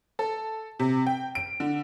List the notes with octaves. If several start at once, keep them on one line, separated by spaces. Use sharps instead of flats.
A4
C3
G5
D7
D3